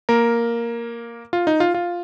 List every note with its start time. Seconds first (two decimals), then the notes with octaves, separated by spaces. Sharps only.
0.09 A#3 A#4
1.33 F4
1.47 D#4
1.60 F4
1.74 F4